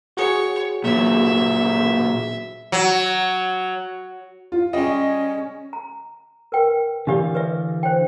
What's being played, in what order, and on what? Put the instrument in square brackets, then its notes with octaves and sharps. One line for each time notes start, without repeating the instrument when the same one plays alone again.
[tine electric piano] F#4 G#4 [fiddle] C#5
[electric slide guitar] A#2 F#3 [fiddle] E5
[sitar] F#3
[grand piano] F4
[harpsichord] G3 G#3 [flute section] C#4 [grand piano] D#5
[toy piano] A#5
A#4 B4 G5
[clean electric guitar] D3 E3 F5 [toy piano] D4 G4 D5
[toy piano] B4 D5 E5
C5 C#5 G5